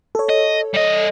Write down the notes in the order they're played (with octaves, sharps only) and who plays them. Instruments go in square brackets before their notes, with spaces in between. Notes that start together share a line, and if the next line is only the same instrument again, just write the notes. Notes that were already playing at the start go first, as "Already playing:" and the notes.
[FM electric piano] A4 C#5
[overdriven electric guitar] D#5
G3 D#5